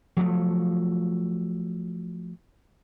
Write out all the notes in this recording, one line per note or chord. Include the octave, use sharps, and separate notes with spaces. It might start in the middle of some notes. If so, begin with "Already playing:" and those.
F3 F#3 A3